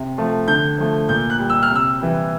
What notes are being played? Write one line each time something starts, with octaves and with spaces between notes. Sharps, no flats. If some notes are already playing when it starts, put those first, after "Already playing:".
Already playing: C3
F3 A3
D3 G6
F3 A3
A#2 G6
F#6
G3
E6
F6
C3
E6
E3 G3